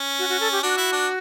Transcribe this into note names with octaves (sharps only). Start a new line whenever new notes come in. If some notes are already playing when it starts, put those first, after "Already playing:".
Already playing: C#4
F#4
F#4
A4
G4
D4 F#4
E4
D4